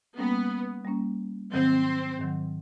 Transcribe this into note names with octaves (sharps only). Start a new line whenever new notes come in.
G3 A#3 B3 C#4
G3 A#3 C#4
G#2 D#3 F#3 C4
G#2 D#3 F#3